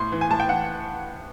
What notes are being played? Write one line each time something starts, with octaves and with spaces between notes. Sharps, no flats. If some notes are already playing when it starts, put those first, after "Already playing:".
Already playing: A2 C6
E3
G#5
A2 A5
G5
E3 F#5